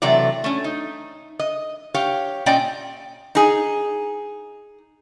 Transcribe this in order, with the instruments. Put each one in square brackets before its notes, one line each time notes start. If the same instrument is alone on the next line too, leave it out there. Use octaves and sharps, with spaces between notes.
[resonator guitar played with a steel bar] C3 E3 F#3 A3 D5
A3 C#4
D#4
D#5
G4 C#5 F5
A#2 C#4 D5 D#5 G5 G#5
D#4 G#4